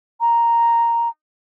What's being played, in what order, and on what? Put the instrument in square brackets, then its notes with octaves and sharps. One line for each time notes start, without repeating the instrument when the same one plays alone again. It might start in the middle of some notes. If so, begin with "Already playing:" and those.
[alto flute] A#5